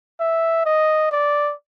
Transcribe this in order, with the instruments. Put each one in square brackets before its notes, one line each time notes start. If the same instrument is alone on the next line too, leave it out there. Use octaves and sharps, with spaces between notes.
[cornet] E5
D#5
D5